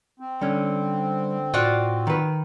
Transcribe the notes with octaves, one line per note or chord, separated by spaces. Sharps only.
C4
D3 G3 C#4
A2 F4 F#4 D5
D#3 B4